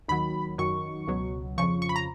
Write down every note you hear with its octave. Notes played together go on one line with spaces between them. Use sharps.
D#2 D#3 F#3 B5
F#2 D#3 F#3 C#6
C#2 B2 F#3
F2 C#3 F3 C#6
C#6
B5
A#5